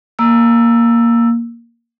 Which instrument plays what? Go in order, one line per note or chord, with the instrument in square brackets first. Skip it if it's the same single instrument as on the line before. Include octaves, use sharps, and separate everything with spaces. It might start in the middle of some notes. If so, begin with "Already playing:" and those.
[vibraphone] A#3 E6